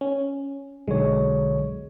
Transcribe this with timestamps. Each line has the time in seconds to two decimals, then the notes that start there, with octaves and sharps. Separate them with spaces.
0.01 C#4
0.88 B1 D3 G#3 C#5